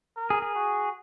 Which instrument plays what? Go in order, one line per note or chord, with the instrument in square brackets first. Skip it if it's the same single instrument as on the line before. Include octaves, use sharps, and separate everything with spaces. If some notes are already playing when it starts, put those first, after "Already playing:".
[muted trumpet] A#4
[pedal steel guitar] G#4
G#4
[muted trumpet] F#4